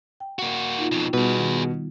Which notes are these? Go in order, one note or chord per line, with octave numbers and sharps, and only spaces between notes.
G5
A#3 F#4
D#4 F4
F2 B2
B2 G3 B3 G#4 B4
D#3